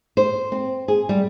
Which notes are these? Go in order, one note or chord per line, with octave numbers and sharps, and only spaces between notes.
C5
C4
G#4
G3